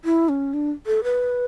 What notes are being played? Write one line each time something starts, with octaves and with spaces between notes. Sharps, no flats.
E4
C#4
D4
A4
B4